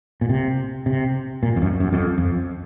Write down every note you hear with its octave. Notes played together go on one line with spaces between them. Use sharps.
A#2
C3
C3
A#2
F2
F#2
F#2
F2
F2